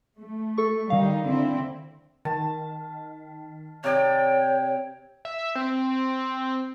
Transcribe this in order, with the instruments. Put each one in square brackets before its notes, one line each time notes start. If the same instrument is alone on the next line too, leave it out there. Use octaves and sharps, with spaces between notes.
[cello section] A3
[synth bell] A4 C#6
[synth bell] D#3 F5 [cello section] G3 D#4
[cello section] D3 C4 E4
[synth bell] D#3 [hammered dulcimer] A5
[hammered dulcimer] C3 D5 G5 [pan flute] C#5
[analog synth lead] E5
C4